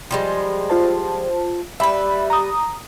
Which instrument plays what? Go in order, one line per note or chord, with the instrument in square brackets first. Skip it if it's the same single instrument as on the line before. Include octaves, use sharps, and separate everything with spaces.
[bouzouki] F3 G3 G#3
[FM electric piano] F4 C5 A5
[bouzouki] G3 B4 [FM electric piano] E5 B5
[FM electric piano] A#5 D#6